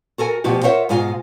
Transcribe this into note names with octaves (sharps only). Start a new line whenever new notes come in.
F#4 A4 A#4 G#5
D2 B2 F3 F#4 G4
F4 A#4 C5 C#5 E5 F#5
G#2 B2 G#3 F4 G#5